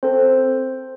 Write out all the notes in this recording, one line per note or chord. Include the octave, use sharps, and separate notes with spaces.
C4 A4 C5